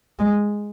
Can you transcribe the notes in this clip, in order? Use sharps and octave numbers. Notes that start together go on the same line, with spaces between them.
G#3